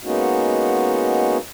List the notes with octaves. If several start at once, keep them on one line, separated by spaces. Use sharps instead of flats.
G#3 A#3 B3 C#4 D#4 F#4